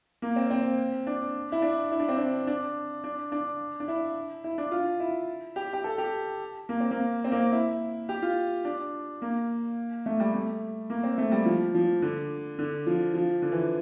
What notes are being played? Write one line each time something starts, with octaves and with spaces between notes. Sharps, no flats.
A#3
C4
C4
D4
E4
D4
E4
D4
C4
D4
D4
D4
D4
D4
E4
E4
D4
F4
E4
G4
G4
A4
G4
A#3
C4
A#3
C4
A#3
C4
E4
G4
F4
D4
A#3
A3
G3
A3
A#3
C4
A3
G3
F3
F3
D3
D3
F3
F3
D3
E3